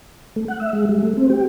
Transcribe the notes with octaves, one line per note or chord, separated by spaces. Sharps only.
A3
F#5
E5
G#3
G3
A3
C4
G4